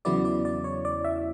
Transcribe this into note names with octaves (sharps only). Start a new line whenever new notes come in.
E2 C#3 F#3 B3 E4 D5
D5
D5
C#5
D5
E5